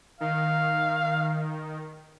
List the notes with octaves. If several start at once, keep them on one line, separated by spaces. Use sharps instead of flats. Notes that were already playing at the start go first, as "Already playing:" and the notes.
D#3 F5